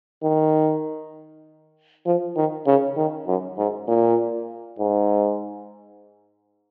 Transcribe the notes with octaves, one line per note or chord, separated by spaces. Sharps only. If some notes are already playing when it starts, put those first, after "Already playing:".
D#3
F3
D#3
C#3
D#3
F#2
G#2
A#2
G#2